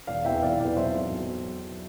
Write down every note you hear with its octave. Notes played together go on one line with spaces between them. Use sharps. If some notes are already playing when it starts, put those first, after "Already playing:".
E1 D5 F5
E2 C3 E3 E5 G5
E1 D5 F5
E2 C3 E3 D5 F5
B1 C5 E5
B2
B1